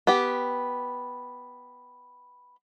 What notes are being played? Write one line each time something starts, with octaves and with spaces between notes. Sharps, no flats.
B3 G4